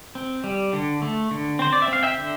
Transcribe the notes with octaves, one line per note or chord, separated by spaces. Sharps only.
C4
G3
D3
A3
D3
C4 C5
D5
E5
C4 F5
E5 G5
D3